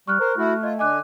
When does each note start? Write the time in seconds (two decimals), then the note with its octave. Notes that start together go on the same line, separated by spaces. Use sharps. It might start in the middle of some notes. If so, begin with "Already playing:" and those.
0.08 G3 C#6 F6 F#6
0.20 A#4 C5
0.37 A3 E4 F#4
0.63 F4 D#5
0.79 D3 D#5 G#5 D6 F#6